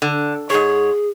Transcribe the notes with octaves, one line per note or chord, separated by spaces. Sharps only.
D3
G#2 G#4 C#5